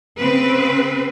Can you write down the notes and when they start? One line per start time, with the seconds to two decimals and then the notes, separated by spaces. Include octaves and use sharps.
0.18 C#3 C4 B4